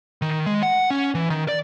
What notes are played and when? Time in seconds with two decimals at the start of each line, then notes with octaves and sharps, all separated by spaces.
0.22 D#3
0.46 G#3
0.63 F#5
0.91 C#4
1.15 E3
1.30 D#3
1.48 D5